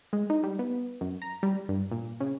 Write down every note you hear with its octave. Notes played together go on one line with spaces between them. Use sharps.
G#3
D#4
G3
B3
F#2
A#5
G3
G2
A#2
C#3